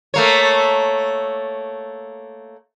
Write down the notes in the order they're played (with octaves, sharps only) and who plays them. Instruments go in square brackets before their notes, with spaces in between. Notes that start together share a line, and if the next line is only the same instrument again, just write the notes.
[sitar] A3 A#3 C#5